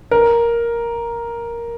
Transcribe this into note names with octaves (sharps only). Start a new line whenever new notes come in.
A#4